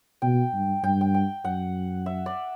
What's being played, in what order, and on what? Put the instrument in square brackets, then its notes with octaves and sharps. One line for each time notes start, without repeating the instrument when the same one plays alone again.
[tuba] B2 [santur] G5
[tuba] G2
[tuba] G2 [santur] G5
[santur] G5
G5
[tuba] F#2 [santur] F#5
[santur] E5
D5